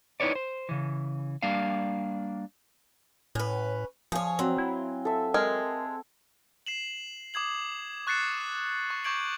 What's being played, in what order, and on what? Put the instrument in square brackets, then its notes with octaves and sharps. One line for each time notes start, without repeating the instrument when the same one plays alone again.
[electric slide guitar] D#4 E4 B4 C#5 D5
C5
C#3 E3
G3 A#3 D4 F5
[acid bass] A2 [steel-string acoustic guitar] C#4 B4
[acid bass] F3 [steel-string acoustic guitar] G#4 C#5 [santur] F5 G#5
[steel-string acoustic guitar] F#3 [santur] C4
[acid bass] E4
[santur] A4 E5
[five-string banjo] G#3 [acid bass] A#4
[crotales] C7 E7 F#7
D6 D#6 G#6 F#7
C#6 F#6 A6 C7 C#7 E7
C#6
C#6 D6 G6 G#6 D7 F#7